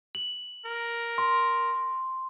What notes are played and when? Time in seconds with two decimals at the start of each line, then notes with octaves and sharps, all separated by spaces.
0.15 F#7
0.66 A#4
1.18 C6